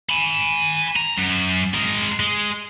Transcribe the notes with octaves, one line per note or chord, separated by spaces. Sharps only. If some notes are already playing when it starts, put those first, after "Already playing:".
G#5 B5
A#5
F#2
G#3 A#4
G#3